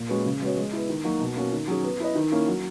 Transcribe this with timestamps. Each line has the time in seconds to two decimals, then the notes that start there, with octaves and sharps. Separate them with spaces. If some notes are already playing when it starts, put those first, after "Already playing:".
Already playing: A#2
0.09 G#3 C#4 F#4 B4
0.26 C#3
0.41 G#3 B3 F#4 C#5
0.57 G#3
0.73 B3 E4
0.89 D#3
1.04 F#3 A#3 D#4 F#4
1.21 B2
1.36 A#3 C#4 F#4
1.52 D#3
1.68 F#3 C#4 G#4
1.84 B3
2.00 E4 B4 D#5
2.15 D#3
2.31 A#3 C#4 E4
2.48 F#3